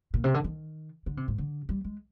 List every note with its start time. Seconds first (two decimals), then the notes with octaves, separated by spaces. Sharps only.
0.14 A#2
0.24 C3
0.34 D3
0.44 D#3
1.06 D3
1.17 C3
1.28 G#2
1.38 D3
1.69 G3
1.84 G#3